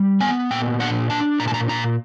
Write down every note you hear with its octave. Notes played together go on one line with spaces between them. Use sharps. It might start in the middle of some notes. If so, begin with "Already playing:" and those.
Already playing: G3
B3 G#5
A#2 G5
D4 F#5
D4 A5
A#2 A#5
A5
A#5
A#2 A#5